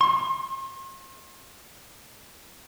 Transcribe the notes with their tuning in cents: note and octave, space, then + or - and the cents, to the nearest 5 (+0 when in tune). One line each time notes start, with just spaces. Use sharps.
C6 +45